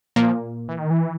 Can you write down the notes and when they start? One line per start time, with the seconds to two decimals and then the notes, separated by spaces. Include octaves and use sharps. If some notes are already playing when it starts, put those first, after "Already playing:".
0.16 A#2 F3 A#3
0.68 E3
0.79 D#3
0.91 E3